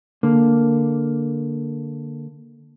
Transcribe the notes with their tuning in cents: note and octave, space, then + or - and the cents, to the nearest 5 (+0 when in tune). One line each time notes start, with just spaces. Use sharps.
D3 +0 A#3 +0